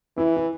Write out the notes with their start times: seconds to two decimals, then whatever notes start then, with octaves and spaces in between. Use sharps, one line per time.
0.17 E3 E4
0.36 E4